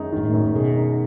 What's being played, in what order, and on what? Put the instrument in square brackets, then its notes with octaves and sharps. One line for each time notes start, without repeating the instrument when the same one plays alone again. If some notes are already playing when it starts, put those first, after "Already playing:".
Already playing: [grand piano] F#2 D#3 G#3 D#4
[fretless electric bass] G#2 [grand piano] D#3
[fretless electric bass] A2
[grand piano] F#2
[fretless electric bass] A2
[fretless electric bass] B2 [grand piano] G#3
[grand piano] D#4